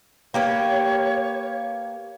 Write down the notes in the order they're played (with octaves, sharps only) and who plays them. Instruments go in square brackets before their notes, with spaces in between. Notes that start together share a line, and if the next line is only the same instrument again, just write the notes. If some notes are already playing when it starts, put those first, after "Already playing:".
[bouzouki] A#3 G4 B4 [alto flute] C#5